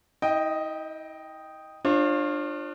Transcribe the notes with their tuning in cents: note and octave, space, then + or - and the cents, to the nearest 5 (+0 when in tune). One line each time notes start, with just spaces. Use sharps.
E4 -45 D#5 +0 G5 +0
D4 +20 F4 +0 C#5 -45